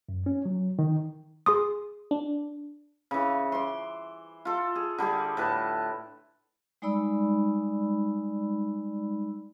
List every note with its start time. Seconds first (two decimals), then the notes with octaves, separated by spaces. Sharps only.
0.09 F#2
0.26 C#4
0.45 F#3
0.79 D#3
1.46 G#4 C6 D#6
2.11 D4
3.11 C#3 E3
3.52 C6 D6
4.45 F4 A4
4.75 G#4
4.98 D3 G3 G4 G#4
5.37 A2 A4 B4 A5
6.82 G3 G#3 D#4 D5 B5 E6